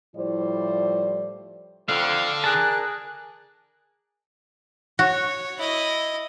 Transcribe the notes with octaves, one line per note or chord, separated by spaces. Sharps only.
A2 F3 G3 E4 C5 D5
F2 D3 F5
G#4 A#4 D5 A5 F#6
F#4 C#5
E4 D#5